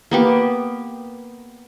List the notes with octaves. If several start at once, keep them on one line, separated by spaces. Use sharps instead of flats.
A#3 B3 G4